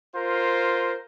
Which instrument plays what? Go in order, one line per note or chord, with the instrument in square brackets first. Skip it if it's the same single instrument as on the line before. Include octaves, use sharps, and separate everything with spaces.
[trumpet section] F4 A#4 C5